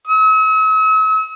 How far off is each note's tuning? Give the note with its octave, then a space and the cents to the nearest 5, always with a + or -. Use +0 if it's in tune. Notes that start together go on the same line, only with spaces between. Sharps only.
E6 -45